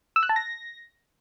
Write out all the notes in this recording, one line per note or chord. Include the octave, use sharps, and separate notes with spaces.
E6
F#6
A5
A#6